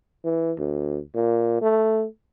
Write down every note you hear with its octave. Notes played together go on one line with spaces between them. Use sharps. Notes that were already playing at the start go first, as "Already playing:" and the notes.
E3
D2
A#2
A3